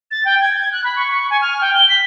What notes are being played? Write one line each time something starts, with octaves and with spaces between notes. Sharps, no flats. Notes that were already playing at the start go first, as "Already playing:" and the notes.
A6
G5
G#6
F#6
B5
C#6
C#6
G#5
F6
G5
G7
B6